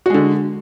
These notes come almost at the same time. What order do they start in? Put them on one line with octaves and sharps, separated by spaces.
F#4 G#3 D3